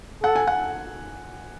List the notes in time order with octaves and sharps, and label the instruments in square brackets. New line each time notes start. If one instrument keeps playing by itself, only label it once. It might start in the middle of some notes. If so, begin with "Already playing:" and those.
[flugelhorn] A4 [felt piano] F#5
[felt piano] G#5
F#5